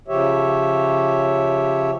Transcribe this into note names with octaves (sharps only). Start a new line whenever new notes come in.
C#3 F3 G4 C#5 E5